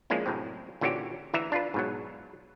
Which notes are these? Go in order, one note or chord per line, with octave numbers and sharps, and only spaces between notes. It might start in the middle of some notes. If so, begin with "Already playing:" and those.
F3 G#3 A#3 C#4 D4 E4
F#2 A2 C3 C4
A#2 D3 E3 C#4 F#4 G4
D2 E3 E5 A#5
D4 F4 B4
G#2 B2 F#3